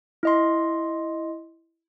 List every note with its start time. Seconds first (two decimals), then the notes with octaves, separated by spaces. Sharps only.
0.23 E4 D#5 C6